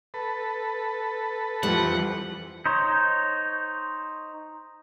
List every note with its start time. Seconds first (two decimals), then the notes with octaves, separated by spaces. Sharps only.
0.14 A4 B4
1.63 F2 E3 F3 G3 F#5
2.66 D#4 C5 C#5